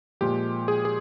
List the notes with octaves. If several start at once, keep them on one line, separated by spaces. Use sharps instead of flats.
A#2 F3 G#3 G4
G#4
G#4